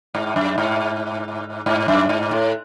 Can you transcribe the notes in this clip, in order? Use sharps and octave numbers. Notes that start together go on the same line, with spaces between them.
G#2
F#2
G#2
G#2
F#2
G#2
A2